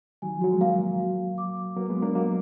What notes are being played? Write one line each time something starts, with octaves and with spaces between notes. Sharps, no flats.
D#3 F#3 G#5
F3
F#3 F#4
G#3
F#3 A#3 F5
F5
F#4
F#4
D6
D6
F#3 A#3 B4
G#3 B3
F#4
A#3 D4
F#3 A#3 D#5